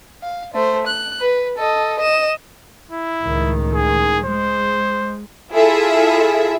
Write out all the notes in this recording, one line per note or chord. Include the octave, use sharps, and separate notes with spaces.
F5
A3 C5
F#6
B4
A4 D#5
D#5 E7
E4
C#2 A2 D#3
G#4
G#3 C5
E4 F4 G#4 A4 E5